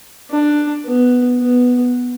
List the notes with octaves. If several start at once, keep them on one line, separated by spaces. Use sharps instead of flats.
D4
B3
B3